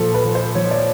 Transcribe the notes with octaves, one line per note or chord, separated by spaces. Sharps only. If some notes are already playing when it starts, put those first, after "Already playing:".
Already playing: A#2 F3 A4
B4
F3
C5
F3 C#5
D5